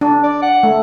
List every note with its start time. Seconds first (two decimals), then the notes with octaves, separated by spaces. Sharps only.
0.01 D4
0.23 D5
0.42 F#5
0.63 A3